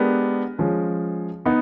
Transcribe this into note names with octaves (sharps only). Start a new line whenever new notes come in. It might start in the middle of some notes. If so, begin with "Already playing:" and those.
Already playing: G#3 B3 D4 G4 A#4
F3 G#3 C#4
B3 D#4